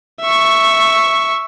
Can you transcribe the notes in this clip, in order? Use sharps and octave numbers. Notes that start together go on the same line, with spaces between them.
E5 C#6